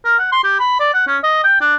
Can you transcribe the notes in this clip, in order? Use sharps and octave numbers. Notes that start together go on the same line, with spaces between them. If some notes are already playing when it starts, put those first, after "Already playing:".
A#4
F#5
C6
G4
B5
D5
F#5
C#4
D#5
G5
D4